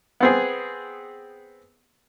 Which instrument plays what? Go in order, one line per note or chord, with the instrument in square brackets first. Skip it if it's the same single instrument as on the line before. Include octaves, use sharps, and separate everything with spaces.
[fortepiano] B3 C4 G#4